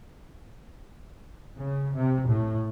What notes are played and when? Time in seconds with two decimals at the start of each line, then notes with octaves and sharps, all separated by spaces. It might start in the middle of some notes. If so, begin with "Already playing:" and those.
1.56 C#3
1.94 C3
2.29 A2